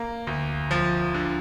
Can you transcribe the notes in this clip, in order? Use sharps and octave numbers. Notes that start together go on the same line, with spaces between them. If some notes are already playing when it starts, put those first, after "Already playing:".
Already playing: A#3
D2
F3
D3